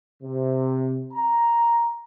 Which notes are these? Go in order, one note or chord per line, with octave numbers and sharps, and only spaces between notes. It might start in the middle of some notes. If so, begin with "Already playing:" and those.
C3
A#5